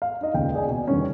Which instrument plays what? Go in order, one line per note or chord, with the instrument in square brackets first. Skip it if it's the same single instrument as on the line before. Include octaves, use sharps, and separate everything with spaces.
[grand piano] F5
D4 D#4 D#5
D#1 C#2 G5
G#4 D5 D#5 G#5
B2
E2 D3 D#3 G3 B3 C#4